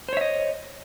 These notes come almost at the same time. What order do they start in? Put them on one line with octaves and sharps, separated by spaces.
C5 C#5 E5 D#5